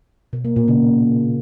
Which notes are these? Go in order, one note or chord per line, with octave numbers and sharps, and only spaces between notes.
B2
A#3
A#2
C#3